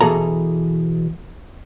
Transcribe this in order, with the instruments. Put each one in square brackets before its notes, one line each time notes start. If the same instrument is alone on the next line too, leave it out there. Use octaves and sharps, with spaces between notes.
[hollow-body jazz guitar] B2 E3 G#4 A4 A#5